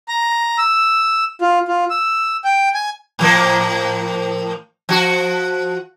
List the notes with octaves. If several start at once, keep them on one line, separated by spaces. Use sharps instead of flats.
A#5
E6
F4
F4
E6
G5
G#5
A2 F3 A#3
F3 F#4